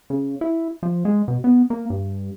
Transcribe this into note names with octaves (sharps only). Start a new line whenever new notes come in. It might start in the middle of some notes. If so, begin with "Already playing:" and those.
C#3
E4
F3
G#3
B2
B3
A#3
G2